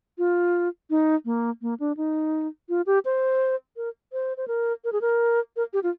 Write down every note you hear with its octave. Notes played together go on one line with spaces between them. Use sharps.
F4
D#4
A#3
A#3
D4
D#4
F4
G4
C5
A#4
C5
C5
A#4
A#4
G#4
A#4
A#4
G4
F4